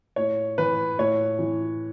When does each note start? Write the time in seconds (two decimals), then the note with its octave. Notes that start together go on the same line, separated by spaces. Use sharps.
0.16 A2 C#5
0.58 E3 B4
0.98 A2 C#5
1.39 E3